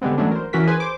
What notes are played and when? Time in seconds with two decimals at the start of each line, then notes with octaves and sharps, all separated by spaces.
0.02 D3 G3 G#3 B3 C4
0.18 E3 F#3 G#3 A3 C#4 D4
0.31 A#4 C5
0.53 E3 C#4 F#4 A#4 B6
0.67 G#4 B4 C5 G#5
0.80 C5 D6